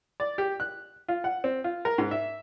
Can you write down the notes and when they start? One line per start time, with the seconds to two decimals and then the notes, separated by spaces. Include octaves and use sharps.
0.20 D5
0.38 G4
0.60 F#6
1.08 F4
1.24 F#5
1.44 C4
1.64 F4
1.85 A#4
1.98 G#2
2.11 E5